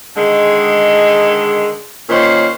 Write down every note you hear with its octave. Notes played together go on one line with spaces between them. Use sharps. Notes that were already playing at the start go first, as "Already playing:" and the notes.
D3 D#3 G#3
A#2 D#3 C#4 C5